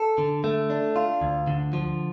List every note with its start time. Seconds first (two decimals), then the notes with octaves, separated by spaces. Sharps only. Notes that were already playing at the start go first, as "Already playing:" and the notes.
Already playing: A4
0.18 D3
0.44 A3
0.70 D4
0.96 F4
1.21 D2
1.47 D3
1.73 F3